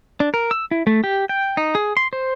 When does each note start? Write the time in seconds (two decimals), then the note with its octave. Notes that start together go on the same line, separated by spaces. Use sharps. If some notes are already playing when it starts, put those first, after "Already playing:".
0.20 D4
0.34 A#4
0.51 E6
0.71 E4
0.87 A3
1.04 G4
1.29 G5
1.57 D#4
1.75 G#4
1.97 C6
2.13 C5